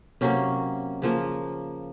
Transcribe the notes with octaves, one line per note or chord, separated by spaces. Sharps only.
C3 F#3 A#3 C#4
C#3 F3 A#3